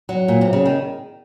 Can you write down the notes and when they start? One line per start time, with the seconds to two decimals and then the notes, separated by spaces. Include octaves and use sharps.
0.09 F#3
0.28 A#2
0.41 C3
0.53 C#3
0.66 D#3